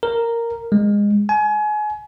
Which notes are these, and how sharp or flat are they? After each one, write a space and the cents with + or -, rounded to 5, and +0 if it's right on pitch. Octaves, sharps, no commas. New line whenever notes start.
A#4 -5
G#3 -20
G#5 +30